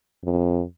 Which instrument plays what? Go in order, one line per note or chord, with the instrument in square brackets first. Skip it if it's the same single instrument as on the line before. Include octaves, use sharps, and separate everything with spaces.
[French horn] F2